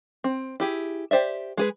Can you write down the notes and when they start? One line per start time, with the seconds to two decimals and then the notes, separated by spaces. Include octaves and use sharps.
0.24 C4
0.60 E4 G4 G#4
1.11 G4 C5 D5 E5
1.57 G#3 G#4 B4